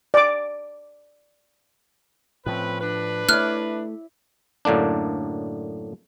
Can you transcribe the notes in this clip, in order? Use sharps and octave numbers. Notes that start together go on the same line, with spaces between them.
D5 D6
A2 F3 C4 C#4 B4
D4 B4
A3 E4 C#5 D5 F6 F#6
F#2 A2 D3 A#3 D4